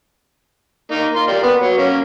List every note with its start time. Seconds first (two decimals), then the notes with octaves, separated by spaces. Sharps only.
0.91 A#3 D#4
1.15 F4 C6
1.28 A#3 G4 D5
1.43 B3 B4
1.61 F#3
1.77 A#3 C#4